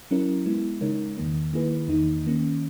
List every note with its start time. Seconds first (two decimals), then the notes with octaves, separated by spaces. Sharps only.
0.11 F#3 C#4 E4 A#4
0.46 G#3 B3 E4
0.81 C#3 G#3 D#4 A#4 C#5
1.17 E2 D#3 A#3
1.53 D#3 A#3 E4 G#4 B4
1.88 E2 D#3 A#3 D#4
2.24 D#3 A#3 C#4